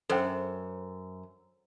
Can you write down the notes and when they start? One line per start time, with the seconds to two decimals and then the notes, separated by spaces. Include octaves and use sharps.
0.10 F#2 A4 C5 G5